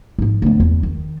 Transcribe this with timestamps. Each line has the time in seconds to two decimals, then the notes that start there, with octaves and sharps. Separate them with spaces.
0.18 G#2 F3
0.42 D2 B3
0.60 E2
0.83 D#3